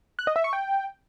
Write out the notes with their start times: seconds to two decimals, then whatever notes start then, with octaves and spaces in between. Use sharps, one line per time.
0.19 F#6
0.27 D#5
0.36 E5
0.44 C#6
0.53 G5